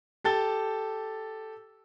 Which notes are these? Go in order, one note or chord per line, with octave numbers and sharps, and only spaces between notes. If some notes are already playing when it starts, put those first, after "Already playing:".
G4 A4 A6 G7